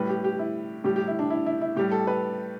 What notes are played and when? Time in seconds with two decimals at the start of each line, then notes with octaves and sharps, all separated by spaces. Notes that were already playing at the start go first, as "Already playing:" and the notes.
Already playing: A2 G3 B4
0.09 G4
0.24 G4
0.39 E4
0.84 A2 G3 G4
0.96 G4
1.08 E4
1.19 D4
1.30 E4
1.46 E4
1.61 E4
1.76 A2 G3 G4
1.92 A4
2.07 B4